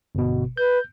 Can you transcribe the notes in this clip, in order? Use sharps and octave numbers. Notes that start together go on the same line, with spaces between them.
G1 B2
B4 G6